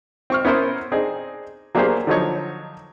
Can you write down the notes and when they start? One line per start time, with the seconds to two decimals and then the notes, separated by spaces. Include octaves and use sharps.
0.30 C4 C#6 F6
0.45 B3 C#4 E4 A#4 C5
0.92 C4 D4 D#4 G#4
1.75 F#3 A#3 D4 G4 G#4 C5
2.07 D3 F3 F#3 D#4 C#5